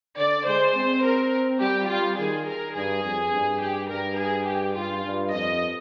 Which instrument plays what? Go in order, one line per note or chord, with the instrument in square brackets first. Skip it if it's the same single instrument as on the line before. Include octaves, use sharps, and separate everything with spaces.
[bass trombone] D3 [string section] D5
[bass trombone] G#3 [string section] C5
[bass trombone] C4
[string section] A#4
[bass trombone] G3 [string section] G4
[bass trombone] G3 [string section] F4
[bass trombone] D#3 [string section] G#4
[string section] A#4
[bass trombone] G2 [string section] G#4
[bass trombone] F2
G2
[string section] G4
[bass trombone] G2 [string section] A#4
[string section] G#4
G4
[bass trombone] G2 [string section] F4
[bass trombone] G2
[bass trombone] F2 [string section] D#5